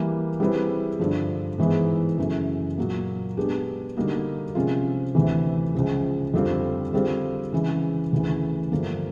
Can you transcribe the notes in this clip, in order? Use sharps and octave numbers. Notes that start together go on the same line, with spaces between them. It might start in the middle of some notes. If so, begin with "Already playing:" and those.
Already playing: E3 G3 A#3
G3 C4 E4 G#4 B4
G2 D3 F3
G#2 E3 G#3 B3 E4
F#2 C#3 E3 A3
A#2 F#3 A#3
G#3 B3 D4 G4
D3 G3 A#3 D#4 F#4
C3 F3 G#3 C#4 F4
D2 C3 E3
C#2 C#3 F3
F2 D3 G3 C4 F4
D3 G3 C4 F4
C#3 E3 G#3
D2 C#3 E3
G2 D3 F3 A#3